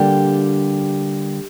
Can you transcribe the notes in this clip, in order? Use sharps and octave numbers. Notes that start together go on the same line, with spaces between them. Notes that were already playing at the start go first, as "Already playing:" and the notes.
Already playing: D3 G3 A#3 G4